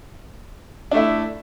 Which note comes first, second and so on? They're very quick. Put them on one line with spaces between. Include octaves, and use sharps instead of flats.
D4 A3 E4